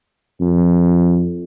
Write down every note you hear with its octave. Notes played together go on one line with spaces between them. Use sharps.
F2